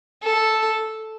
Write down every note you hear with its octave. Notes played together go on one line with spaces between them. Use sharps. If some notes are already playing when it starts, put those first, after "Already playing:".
A4